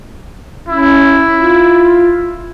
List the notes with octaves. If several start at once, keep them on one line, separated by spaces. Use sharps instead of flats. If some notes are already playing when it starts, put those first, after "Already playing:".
C#4 E4
F4